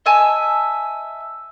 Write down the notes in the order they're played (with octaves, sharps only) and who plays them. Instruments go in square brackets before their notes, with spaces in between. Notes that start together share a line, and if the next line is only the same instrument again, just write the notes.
[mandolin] D#5 E5 G#5 A5